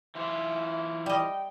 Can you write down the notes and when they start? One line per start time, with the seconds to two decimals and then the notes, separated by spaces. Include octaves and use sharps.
0.15 E3 F4 E5
1.06 G3 D#5 G5